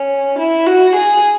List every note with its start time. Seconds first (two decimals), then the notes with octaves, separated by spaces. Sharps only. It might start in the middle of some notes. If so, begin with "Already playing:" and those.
Already playing: C#4
0.39 E4
0.66 F#4
0.95 G#4